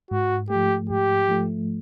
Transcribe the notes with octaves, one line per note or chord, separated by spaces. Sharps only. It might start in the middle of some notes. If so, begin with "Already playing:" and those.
G#2 F#4
A3 G4
F3
G#2 G4
F3 A3